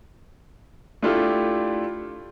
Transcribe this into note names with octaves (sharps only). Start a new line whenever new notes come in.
A3 D4 E4 F4 G4 A4